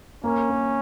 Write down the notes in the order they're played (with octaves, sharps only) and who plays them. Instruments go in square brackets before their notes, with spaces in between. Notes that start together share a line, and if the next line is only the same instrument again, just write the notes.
[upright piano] A#3 [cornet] C#4
[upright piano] A#3